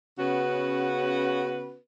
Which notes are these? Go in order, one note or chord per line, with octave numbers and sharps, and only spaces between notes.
C#3 B3 C#4 F#4 B4